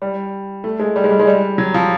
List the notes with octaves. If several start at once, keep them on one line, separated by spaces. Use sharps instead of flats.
G3
A3
G#3
G3
G#3
G3
G#3
G3
F#3
F3